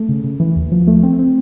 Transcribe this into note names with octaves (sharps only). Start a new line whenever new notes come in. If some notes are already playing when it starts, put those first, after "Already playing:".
Already playing: A3
C#3
C#3
E3
D#2
F3
A3
C4
C4